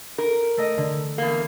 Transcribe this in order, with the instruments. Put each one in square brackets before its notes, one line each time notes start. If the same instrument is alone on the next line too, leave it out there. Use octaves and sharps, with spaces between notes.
[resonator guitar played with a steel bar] A#4
[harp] A3 A4 D#5
D3
[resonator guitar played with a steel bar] E2 A#3